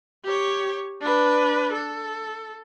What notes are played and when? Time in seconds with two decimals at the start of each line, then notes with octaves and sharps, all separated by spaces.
0.24 G4 C#5
1.02 D4 B4
1.73 A4